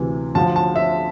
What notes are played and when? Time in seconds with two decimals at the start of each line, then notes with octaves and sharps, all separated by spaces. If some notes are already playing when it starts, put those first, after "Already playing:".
Already playing: D2 C3 E3
0.35 D2 D3 F3 A5
0.56 A5
0.76 E5